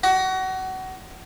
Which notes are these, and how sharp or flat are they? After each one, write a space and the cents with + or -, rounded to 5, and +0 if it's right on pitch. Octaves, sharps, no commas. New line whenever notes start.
F#4 +25